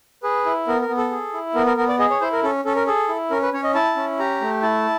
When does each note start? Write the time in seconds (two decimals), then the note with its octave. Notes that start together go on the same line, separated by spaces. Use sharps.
0.23 G#4 B4
0.46 E4
0.68 B3 A#4
0.81 A#4
0.89 B3
0.97 A4
1.11 G#4
1.34 E4
1.55 B3 A#4
1.66 A#4
1.77 B3 A#4
1.88 D5
1.99 G#4 D#5
2.10 C#5
2.21 E4 C5
2.32 A#4
2.43 C#4 A4
2.65 C#4 A4
2.76 A#4
2.87 G#4 A4
3.09 E4
3.30 C#4 A#4
3.42 B4
3.53 C#4 C#5
3.64 D#5
3.74 E4 A5
3.96 C#4
4.19 G4 A#5
4.41 A3
4.62 E4 A5